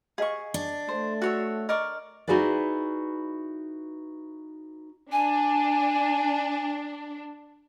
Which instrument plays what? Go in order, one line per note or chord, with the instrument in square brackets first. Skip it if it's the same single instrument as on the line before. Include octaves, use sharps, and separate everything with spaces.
[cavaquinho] G#4 C#6 [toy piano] B4 D#5 F5
[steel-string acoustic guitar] D4
[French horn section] A3 [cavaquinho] C5
[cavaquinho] F#4 C#5 E5
[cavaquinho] A#4 D5 C#6 [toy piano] D#5
[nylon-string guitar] D#4 E4 F#4 G#4 B4 D5
[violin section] D4 [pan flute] G#5